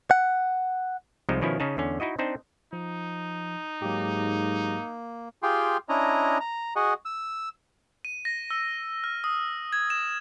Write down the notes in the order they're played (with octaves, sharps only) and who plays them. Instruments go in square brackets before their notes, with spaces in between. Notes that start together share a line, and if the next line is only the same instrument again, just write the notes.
[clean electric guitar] F#5
[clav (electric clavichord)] C2 C3 F3 G3 G#3 D#4
B2 D#3 F3 C#4 E4
C#3 C#4 D#4 G#4 A5
E2 D3 C#4
D#4 E4 F#4 D#5
C4 D4 D#4 C5
[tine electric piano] F3 [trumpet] D#4
[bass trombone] G#2 [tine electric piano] F#3 G4 [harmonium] A#3
[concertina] F4 G4 G#4 G5 C6
C#4 D4 E4 D#5 A#5
A#5
F#4 G#4 D#5 F#5
E6
[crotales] D#7
A#6
E6
F6
D#6
G#6
E7